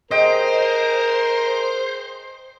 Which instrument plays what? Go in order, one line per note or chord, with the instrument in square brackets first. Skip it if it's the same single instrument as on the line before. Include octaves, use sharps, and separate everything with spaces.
[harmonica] G#4 A#4 [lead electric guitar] C5 [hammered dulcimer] D#5 G5